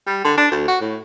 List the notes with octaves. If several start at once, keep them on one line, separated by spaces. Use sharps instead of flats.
G3
D3
D4
D2
F#4
A2